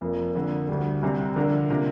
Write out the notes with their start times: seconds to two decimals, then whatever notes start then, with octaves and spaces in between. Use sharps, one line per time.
0.01 F1 F2 F3 A#3
0.35 F2 D3 A#3
0.69 D2 D3 G3
1.03 C2 C3 G3 C4
1.36 D3 F3 D4 F4 A#4
1.70 C3 A#3 D4 F4 A#4